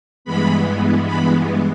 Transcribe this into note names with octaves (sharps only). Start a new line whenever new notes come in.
G2 E3 G#3 B3 B5
B5